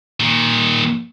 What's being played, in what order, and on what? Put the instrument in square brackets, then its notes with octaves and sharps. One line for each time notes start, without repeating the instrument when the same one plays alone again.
[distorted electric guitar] A#2 D#3